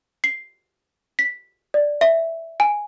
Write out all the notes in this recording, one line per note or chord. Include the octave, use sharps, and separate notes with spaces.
C7
B6
D5
E5
G#5